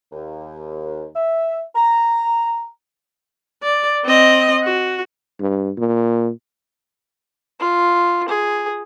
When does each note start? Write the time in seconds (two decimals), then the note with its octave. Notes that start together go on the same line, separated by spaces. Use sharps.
0.12 D#2
1.16 E5
1.76 A#5
3.63 D5
4.05 C4 D#5
4.64 F#4
5.40 G2
5.77 A#2
7.59 F4
8.28 G#4